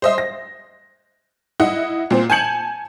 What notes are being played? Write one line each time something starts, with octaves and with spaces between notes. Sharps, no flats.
C5 D#5 E5
A#6
E4 D#5 F#5
A#2 C4
G#5 A5 G6 G#6 C#7 F#7